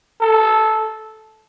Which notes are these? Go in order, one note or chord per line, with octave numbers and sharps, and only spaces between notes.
A4